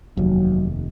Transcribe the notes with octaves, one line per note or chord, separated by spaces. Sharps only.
F1 D#2 F#3